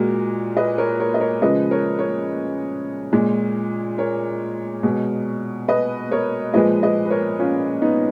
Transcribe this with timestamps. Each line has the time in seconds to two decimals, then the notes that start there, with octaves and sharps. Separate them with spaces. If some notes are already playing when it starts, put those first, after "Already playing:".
Already playing: A#2 G#3 F#4 A#4
0.57 B4 D#5
0.78 A#4 C#5
1.00 A#4 C#5
1.14 D#5
1.20 A#4 C#5
1.42 C#3 F3 G#3 B4 D#5
1.71 A#4 C#5
1.99 A#4 C#5
3.13 A#2 G#3
3.98 A#4 C#5
4.83 B2 G#3
5.68 B4 D#5
6.11 A#4 C#5
6.54 A#2 F3 G#3 B4 D#5
6.82 B4 D#5
7.05 B4
7.10 A#4 C#5
7.39 C#4 F4
7.82 B3 D#4